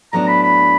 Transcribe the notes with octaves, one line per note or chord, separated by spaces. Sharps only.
A2 F#3 B3 D4 A#5
B5
B5